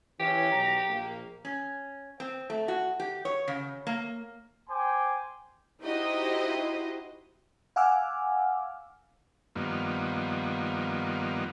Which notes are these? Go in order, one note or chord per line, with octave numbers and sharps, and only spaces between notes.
E3 C#4 G4
B1 A#5
A#1 A#3
C#4
C4
A3
F#4
G4
C#5
C#3
A#3
C5 G5 G#5 C6 D6
D#4 E4 F#4 G4 C5 D#5
F5 F#5 G#5 D6 E6 F6
G2 D#3 F3 A#3 B3